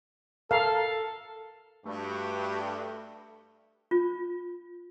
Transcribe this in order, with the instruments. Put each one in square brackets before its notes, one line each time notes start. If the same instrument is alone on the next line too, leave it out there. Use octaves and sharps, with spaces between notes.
[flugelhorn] A4 [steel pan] A#4 F5
[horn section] G2 [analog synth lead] A3 [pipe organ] F#4 G4
[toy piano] F4